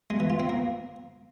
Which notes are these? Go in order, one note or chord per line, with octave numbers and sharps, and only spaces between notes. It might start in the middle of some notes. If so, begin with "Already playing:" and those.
G#3
E3
F4
C4
A#3